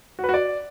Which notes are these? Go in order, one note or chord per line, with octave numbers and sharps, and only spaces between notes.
F#4
B4
F#4
D5